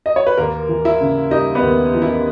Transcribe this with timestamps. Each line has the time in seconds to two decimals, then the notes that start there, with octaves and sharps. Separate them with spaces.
0.06 D#5
0.16 C#5
0.27 B4
0.37 D#2 A#3 A#4
0.69 E3
0.85 E4 E5
1.01 C#3
1.31 G3 D#4 D#5
1.55 B3 B4
1.62 D#2
1.95 E3
2.02 E4